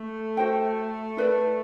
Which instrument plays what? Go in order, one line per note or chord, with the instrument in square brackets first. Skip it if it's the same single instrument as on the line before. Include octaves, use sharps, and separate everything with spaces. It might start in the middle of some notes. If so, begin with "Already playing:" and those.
Already playing: [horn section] A3
[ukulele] F#4 C5 G5
E4 B4 D5